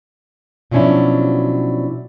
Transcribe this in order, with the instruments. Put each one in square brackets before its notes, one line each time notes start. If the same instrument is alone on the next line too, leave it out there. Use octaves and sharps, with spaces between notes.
[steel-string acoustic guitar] B2 F3 F#3 C#4 D4 E4